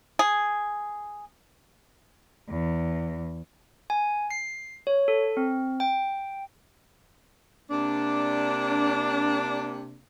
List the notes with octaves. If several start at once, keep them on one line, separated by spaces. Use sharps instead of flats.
G#4
E2
G#5
C7
C#5
A4
C4
G5
C3 A#3 D4